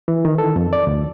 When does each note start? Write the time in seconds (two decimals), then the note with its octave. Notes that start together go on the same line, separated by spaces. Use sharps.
0.08 E3
0.25 D#3
0.38 A4
0.56 F2
0.73 D5
0.87 D2